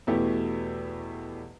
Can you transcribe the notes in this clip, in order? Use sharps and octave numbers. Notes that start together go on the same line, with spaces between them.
E2 B2 A3 E4 G4